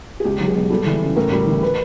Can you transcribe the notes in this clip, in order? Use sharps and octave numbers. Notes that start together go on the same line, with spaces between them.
G#4
C#2 G4
F#3
G#4
B2
G3 A4
E3
C#3
A2 A#4
G3
E3
B4